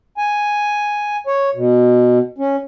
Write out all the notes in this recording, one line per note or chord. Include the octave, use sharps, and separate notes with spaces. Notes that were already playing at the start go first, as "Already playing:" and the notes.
G#5
C#5
B2
C#4